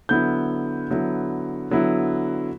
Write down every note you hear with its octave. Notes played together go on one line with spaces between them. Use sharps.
D3 F#3 B3 E4 G6
D3 F#3 B3 E4
D3 F#3 B3 E4